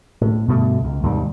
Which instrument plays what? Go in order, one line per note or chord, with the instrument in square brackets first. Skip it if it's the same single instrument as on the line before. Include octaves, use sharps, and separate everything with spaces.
[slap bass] A2
G2 B2 D3 A3
C#2
D#2 G#2 C3 G3